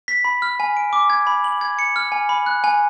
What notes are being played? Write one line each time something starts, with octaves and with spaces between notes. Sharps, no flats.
B6
B5
F6
G#5
D7
D6
G#6
B5
F#7
G#6
C#7
F6
G#5
B5
F#6
G#5